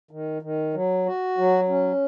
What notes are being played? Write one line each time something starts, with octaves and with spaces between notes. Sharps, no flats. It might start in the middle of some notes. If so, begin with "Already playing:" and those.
D#3
D#3
F#3
F#4
F#3
C#4